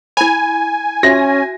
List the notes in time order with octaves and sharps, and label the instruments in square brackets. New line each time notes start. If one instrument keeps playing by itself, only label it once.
[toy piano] E4 B5 [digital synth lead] G#5
[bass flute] C#4 [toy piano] F#4 E5 [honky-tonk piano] A#6